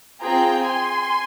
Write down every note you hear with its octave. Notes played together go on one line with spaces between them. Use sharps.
C4 F4 G#4 G5 A#5
G#5 C6